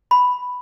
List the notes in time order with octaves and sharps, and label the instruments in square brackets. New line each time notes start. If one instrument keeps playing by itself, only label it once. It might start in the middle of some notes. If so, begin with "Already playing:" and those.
[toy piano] B5